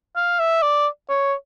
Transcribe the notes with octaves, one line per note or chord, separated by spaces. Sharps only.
F5
E5
D5
C#5